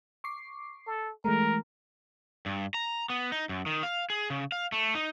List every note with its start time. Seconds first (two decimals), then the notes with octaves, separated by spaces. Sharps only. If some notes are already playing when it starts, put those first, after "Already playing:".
0.24 C#6 D6 C7
0.87 A4
1.25 E3 G#3 A3 A#4
2.46 G2
2.74 A#5
3.10 B3
3.32 D#4
3.49 F#2
3.66 D#3
3.83 F5
4.10 G#4
4.30 C#3
4.52 F5
4.72 A3
4.95 D#4